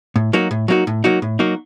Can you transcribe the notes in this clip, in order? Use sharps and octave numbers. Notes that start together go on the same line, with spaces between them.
A2
F#3 A#3 D#4 F#4
A2
F#3 A#3 D#4 F#4
A2
F#3 A#3 D#4 F#4
A2
F#3 A#3 D#4 F#4